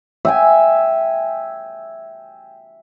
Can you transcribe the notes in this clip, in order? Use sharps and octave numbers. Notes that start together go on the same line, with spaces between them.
E5 G5 G#5